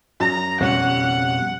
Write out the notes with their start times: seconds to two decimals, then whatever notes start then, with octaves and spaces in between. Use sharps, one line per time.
0.20 F#2 A#5
0.61 F2 B2 G3 C#4 F#5